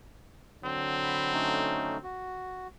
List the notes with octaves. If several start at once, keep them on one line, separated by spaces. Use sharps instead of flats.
D3 F#3 C4
B5
A3 C#4 D#4
F#4